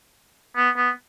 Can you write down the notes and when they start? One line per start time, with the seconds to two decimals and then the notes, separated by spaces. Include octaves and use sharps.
0.56 B3
0.76 B3